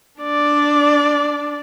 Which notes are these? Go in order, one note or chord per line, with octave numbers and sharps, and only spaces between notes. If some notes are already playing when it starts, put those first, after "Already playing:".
D4 D5